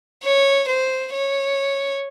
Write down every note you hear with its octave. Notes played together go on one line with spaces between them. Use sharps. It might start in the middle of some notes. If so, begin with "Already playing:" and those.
C#5
C5
C#5